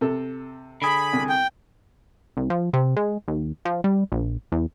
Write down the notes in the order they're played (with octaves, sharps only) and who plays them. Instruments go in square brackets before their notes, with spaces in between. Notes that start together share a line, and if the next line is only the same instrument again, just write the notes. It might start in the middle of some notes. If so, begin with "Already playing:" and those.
[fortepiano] C3 A4
[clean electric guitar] D3 G#4 [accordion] B5
[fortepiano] C2
[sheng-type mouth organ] G5
[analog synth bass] C2
F3
C3
G#3
D#2
F3
G3
A#1
E2